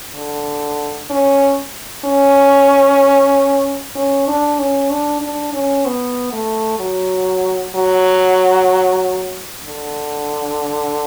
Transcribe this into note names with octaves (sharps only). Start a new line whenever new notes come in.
D3
C#4
C#4
C#4
D4
C#4
D4
D4
C#4
B3
A3
F#3
F#3
D3